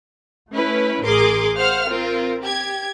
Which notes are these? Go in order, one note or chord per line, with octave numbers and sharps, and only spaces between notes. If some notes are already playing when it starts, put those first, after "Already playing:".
A3 C#4 E4 B4
A1 G#4 A#4 C6 D6
C5 F5 F#5 F6
C4 F4 A#4
G4 G#6